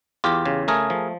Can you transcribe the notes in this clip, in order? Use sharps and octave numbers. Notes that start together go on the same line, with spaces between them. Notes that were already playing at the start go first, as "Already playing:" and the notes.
E2 F4 G4
C#3
A3 G#4 A#4
F3